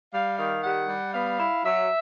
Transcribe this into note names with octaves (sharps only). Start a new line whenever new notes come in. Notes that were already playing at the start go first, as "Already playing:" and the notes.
G3 F5
D#3 F5
G3 F#5
G3
B3 F5
E4
F#3 E5